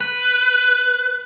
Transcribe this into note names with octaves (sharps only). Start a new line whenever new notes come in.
B4